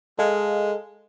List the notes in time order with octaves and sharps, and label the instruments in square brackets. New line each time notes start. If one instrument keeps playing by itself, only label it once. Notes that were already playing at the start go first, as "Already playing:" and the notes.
[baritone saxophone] G#3 [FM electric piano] A4 D#5 F5